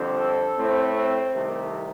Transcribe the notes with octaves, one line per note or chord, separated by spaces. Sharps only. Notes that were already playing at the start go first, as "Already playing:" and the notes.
Already playing: F2 D3 G3 C4
A4
A2 A3 C4
C4
C2 C3 D#3 A3